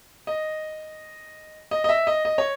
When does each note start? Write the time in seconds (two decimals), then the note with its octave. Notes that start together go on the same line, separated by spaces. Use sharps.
0.27 D#5
1.71 D#5
1.84 D#5
1.89 E5
2.07 D#5
2.25 D#5
2.38 C#5